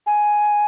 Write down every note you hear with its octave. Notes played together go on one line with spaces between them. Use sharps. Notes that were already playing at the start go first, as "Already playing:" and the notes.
G#5